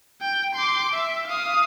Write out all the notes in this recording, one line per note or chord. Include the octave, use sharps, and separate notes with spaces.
G5
C6 D6
E5
F5 D#6